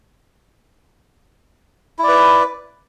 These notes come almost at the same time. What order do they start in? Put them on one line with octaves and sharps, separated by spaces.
E4 D5 B4